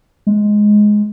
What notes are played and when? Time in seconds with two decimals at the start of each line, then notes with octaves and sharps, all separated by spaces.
0.27 G#3